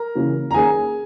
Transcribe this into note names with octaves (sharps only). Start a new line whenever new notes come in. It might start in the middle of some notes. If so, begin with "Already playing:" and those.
Already playing: A#4 A#5
C#3 E3 A#3 C#4
A#5
D#3 A#3 C#4 G#4 G#5